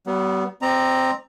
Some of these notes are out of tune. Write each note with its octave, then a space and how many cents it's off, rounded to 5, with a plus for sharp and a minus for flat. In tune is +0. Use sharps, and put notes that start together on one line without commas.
G3 -45 B3 +0
C4 +0 D5 +45 A#5 +0